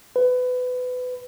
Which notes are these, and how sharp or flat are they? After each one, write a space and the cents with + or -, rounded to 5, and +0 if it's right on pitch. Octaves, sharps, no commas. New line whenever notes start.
B4 +25